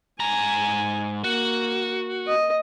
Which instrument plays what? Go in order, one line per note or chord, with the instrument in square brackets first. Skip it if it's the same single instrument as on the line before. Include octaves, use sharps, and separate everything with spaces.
[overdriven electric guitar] G#2 A#5 [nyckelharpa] G#5
[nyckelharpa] A#3 [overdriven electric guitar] F#4
[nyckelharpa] D#5